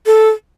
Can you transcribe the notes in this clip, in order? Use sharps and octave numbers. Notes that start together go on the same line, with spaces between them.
A4